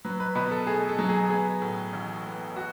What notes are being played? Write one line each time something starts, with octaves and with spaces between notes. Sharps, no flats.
F#3 B4
B4
B2 B4
A4
A3 G#4
A4
F#3
G#4
B3 G#4
A2
A1
B3
F#4